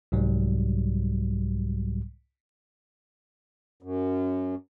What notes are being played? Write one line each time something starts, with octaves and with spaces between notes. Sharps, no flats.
C2 G#2 F#3 G3
F#2